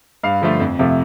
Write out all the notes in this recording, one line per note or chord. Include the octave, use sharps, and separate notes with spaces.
G2 F5
D3 F3 A3
F2
C3 F3 A3